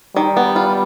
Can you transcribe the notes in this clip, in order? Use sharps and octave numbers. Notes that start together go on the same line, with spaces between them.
D#3 G3
B3
F4